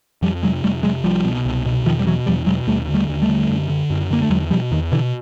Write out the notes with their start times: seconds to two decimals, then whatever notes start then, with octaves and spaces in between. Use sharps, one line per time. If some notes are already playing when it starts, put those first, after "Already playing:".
0.22 F2 F3 G3
0.43 C3 F#3 G#3
0.63 F2 G3 A3
0.83 C3 F#3 G#3
1.04 C2 F3 G3
1.25 B2
1.45 C2
1.66 B2
1.85 E2 D#3 F3
1.99 G3
2.06 B2 E3 F#3
2.26 E2 F3 G3
2.47 B2 F#3 G#3
2.67 D#2 G3 A3
2.88 D3
2.94 G3 A3
3.09 D#2
3.22 G3 A3
3.29 D3
3.49 F#2
3.69 D3
3.90 F#2
4.10 D3 A#3
4.22 A3
4.30 E2 F#3 G#3
4.50 B2 F3 G3
4.71 E2 D#3
4.92 B2 D3 E3